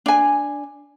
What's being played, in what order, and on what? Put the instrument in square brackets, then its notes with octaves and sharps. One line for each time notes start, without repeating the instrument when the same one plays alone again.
[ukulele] D4 G#5